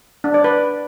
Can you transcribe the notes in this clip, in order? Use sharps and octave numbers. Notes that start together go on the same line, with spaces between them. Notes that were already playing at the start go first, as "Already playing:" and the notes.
D4
D5
B4